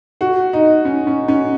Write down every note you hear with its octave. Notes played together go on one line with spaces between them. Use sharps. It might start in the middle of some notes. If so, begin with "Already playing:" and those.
F#4
D#4
C#4
C#4
C#4